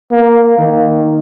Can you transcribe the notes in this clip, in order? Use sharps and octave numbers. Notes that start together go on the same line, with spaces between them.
A#3
D#3